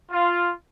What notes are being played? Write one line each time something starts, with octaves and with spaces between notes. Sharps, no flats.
F4